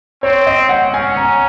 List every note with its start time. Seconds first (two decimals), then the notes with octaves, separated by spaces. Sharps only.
0.23 C4 C#5
0.47 D#5
0.69 F#5
0.93 C#4 G#5
1.17 A#5